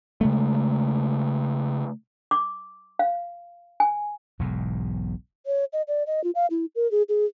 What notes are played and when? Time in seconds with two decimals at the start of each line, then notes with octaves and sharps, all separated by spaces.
0.21 C#3 G#3 A3
2.31 D6
2.99 F5
3.80 G#5
4.39 E1 B1 E2 G#2
5.46 C#5
5.73 D#5
5.88 D5
6.07 D#5
6.24 F4
6.35 F5
6.51 E4
6.76 A#4
6.91 G#4
7.09 G#4